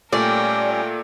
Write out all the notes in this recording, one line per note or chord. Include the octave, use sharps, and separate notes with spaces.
A#2 G3 A3 C#4 A#4 D5 G5